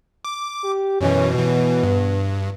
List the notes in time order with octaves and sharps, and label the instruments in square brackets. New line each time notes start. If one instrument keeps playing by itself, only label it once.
[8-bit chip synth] D6
[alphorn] G4
[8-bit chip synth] F#2 B2 E3 [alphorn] C#4
[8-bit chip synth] B2 E3 [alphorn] B3
[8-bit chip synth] G2